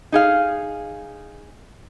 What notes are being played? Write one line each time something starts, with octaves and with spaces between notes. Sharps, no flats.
D#4 G#4 F5